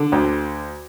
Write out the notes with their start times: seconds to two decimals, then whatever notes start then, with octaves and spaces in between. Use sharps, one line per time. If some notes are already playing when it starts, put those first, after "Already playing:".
Already playing: D3
0.12 D2